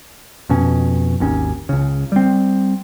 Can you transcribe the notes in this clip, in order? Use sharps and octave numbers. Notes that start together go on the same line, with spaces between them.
F2 B2 C#4
G#1 D#2 C#4
C#2 C#3
G3 C4